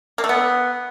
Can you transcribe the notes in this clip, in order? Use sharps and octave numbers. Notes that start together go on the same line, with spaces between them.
A#3
A3
B3